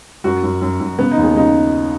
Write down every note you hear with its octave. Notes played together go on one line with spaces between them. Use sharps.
F#2 F#4
F#2
F#2
F#2
C#3 B3
D#4
D#2
G#4
C#3 D#4